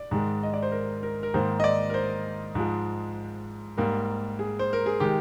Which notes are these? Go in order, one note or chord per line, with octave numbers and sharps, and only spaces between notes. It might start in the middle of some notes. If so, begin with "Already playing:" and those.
Already playing: D5
G#2 D#3 G#3
D#5
D5
C5
A#4
A#4
A#4
G#2 D#3 A#3 C5
D#5
D5
A#4
C5
G#2 F3 G#3
G#2 G3 A#3 A#4
G#4
C5
A#4
G#4
D#3 G#3 G4